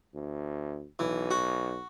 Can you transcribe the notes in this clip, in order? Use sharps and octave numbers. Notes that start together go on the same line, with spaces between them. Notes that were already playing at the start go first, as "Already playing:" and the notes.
D2
B1 E3
F#4